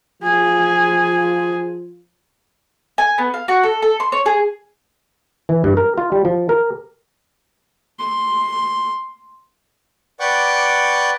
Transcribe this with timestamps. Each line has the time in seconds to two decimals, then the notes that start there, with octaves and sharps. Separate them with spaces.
0.23 F3 F4 G#4
2.98 G#5
3.18 B3
3.34 F5
3.48 F#4
3.63 A4
3.82 A4
4.00 C6
4.12 C#5
4.26 G#4
5.49 E3
5.64 G2
5.77 A#4
5.98 F4
6.12 G3
6.25 F3
6.49 A#4
7.98 C6
10.20 B4 D5 F#5 G5 C#6 D6